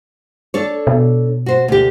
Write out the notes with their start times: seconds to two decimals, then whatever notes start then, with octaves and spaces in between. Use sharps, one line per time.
0.54 D4 A4 C#5
0.87 B2
1.46 F#4 C5
1.68 D2 G4